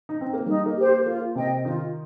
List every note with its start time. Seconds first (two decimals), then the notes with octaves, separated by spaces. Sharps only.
0.09 D#4
0.21 C4
0.33 A#3
0.46 G3 D#4
0.66 A#3
0.77 G4 C5
0.85 A#3
1.06 A#3 F4
1.35 C3 C4 D#5 G5
1.65 D#3 D#4 F4